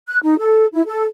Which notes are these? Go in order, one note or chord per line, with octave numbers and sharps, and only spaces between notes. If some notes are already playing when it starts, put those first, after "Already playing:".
F#6
D#4
A4
E4
A4